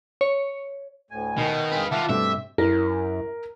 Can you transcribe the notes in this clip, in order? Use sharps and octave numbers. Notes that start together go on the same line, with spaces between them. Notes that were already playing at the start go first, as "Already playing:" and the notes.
C#5
D2 A2 G#5
B2 D#3
C4 G#4 B4 F5
D#3 F4 E5 F#5 A5 D6
G2 B2 A3 C4 D5 E5
F#2 E4 A#4